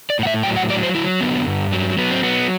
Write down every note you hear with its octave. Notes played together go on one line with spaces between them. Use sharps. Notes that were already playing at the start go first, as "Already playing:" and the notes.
D5
A2 F#5
E5
F#3 G5
F#5
F#3 D5
C5
F#3 E4
D3 B3
G2
F#3
F#3 B3
C4
F#3 B3